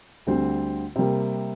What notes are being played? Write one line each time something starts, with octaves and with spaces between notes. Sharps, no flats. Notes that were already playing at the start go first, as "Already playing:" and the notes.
D2 D3 G3 C4
C3 G3 A#3